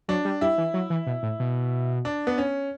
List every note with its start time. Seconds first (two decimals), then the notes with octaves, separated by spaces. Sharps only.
0.08 F#3 D4
0.25 G3
0.41 G3 E4
0.58 E3
0.74 F#3
0.90 E3
1.07 B2
1.23 A2
1.40 B2
2.05 D4
2.27 B3
2.38 C#4